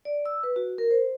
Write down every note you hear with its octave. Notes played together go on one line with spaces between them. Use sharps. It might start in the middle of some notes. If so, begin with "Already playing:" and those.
D5
E6
B4
F#4
A#4
C5